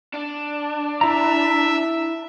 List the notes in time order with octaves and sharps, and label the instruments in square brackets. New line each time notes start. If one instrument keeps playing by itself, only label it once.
[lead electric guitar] D4
[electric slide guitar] E4 A#5 [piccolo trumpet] E5